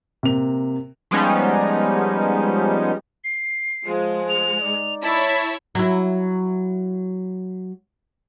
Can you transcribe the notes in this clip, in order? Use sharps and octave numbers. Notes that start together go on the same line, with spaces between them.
C3 A#3 F7
F3 G3 G#3 B3 C#4 D#4
C7
F3 G#3 F4
F7
D#4 D5
E4 C#5 A5
F#3 E4